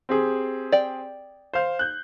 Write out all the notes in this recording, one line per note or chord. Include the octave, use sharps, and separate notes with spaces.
C4 G4 G#4
D5 G5
C5 F5
F#6 G6